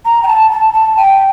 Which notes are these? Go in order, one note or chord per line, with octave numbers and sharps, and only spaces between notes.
A#5
G5
A5
A5
A5
G5